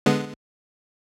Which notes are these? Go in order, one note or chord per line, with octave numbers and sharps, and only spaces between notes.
D3 G#3 B3